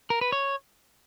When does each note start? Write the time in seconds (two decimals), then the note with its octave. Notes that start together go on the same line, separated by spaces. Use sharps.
0.10 A#4
0.21 B4
0.32 C#5